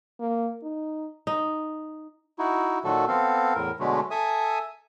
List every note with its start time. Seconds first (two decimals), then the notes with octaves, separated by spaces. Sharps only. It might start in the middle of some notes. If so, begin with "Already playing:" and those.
0.20 A#3
0.63 D#4
1.27 D#4
2.39 D#4 E4 F#4
2.84 A#2 D#3 F#3 F#4 A4
3.08 B3 C4 A4 F5
3.55 E2 A2 A#4
3.80 B2 D3 F#3 G#3 A3
4.11 A4 E5 G#5 D#6